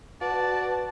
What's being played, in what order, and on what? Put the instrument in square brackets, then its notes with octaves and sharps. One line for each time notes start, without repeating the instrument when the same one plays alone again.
[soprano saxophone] F#4 [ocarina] B4 [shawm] D5 [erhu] A5